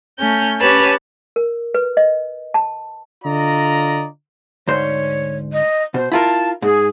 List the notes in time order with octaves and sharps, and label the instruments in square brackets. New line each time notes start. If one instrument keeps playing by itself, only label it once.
[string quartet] A3 C#4 G6
C#4 G4 B4 C#5 A5
[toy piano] A#4
B4
D#5
A5
[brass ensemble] D3 F4 D5 D#5 A#5
[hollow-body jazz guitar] D2 G#2 C5 [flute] C#5
[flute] D#5
[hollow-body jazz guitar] B2 [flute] C5
[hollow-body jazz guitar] E4 F4 A#4 [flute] A5
[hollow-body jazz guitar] G#2 [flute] G#4